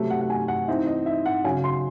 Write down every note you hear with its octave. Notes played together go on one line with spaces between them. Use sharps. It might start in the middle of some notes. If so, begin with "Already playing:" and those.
Already playing: C3 F#3 A3
F#5
F#5
G#5
F#5
E3 C4 D#4 E5
D#5
E5
F#5
C#3 F#3 C#4 G#5
C6